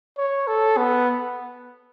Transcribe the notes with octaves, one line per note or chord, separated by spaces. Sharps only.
C#5
A4
B3